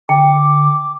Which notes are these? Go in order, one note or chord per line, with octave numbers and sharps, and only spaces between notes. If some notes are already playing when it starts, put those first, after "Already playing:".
D3 G5 D6